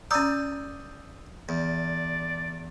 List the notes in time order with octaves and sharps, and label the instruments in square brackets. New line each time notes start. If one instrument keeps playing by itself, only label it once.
[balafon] C#4 A#5 [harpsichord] D5 G#5 [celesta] D#6 E6 G6
[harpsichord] E2 [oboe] D5